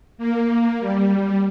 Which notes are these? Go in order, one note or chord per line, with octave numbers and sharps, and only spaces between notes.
A#3
G3